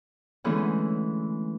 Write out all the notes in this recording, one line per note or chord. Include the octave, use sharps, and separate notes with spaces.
D3 E3 G#3 A3 B3 C#4